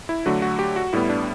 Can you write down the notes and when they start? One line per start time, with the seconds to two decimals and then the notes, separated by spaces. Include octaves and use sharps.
0.09 E4
0.26 D3 F#3 A3 F#4
0.42 F#4
0.59 G4
0.76 F#4
0.93 A2 G3 B3 E4
1.09 D4